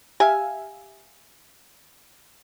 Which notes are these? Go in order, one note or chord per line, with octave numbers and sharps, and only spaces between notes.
G4 E5 F5 G#5